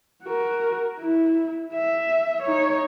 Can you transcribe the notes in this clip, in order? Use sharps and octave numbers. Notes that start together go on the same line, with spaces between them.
F#4 A#4
E4
E5
D#4 C#5